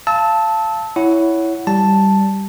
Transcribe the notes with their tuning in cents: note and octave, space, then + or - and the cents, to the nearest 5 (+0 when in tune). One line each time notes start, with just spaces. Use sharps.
F5 -25 A5 +0 E6 -30
E4 +0 C#5 +15 F#5 +5
G3 -5 A5 +0